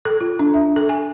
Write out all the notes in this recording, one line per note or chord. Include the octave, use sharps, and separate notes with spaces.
A4
F4
D4
E5
A4
G#5